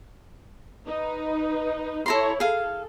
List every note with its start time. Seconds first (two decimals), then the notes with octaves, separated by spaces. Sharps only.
0.86 D#4 B4
2.06 E4 A4 C#5 A#5 C6
2.40 G#4 A4 F5